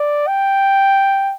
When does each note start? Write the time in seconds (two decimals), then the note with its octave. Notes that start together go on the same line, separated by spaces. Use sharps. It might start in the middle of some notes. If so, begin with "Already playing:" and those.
Already playing: D5
0.28 G5